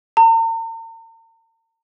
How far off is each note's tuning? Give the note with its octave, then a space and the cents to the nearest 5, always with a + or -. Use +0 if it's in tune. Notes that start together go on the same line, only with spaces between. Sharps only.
A#5 -45